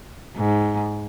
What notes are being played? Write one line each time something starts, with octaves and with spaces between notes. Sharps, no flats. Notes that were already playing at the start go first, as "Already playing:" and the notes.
G#2